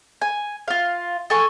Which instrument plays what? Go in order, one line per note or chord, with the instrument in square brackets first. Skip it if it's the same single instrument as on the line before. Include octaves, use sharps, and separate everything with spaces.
[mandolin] G#5
F4 F5
A4 G#5 C#6